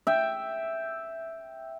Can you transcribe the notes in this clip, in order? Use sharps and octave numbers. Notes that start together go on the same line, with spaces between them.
E5 G5